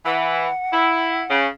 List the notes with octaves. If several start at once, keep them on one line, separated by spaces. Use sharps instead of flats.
E3 F#5
E4
C#3